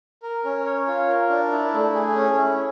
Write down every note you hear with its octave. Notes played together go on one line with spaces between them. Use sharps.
A#4
C#4
C#5
F4
A#4
D4
E4
A3
G#4
C#4
E4